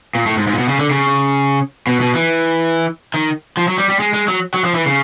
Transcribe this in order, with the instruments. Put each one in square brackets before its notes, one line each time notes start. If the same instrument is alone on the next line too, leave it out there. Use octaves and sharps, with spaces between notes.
[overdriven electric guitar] A#2
A2
G#2
G#2
A#2
B2
C#3
D3
C#3
B2
B2
E3
D#3
F3
F#3
G3
G3
G#3
G#3
F#3
F#3
F3
E3
C#3